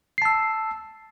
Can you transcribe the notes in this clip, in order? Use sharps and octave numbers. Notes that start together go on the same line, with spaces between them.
A5 E6 C7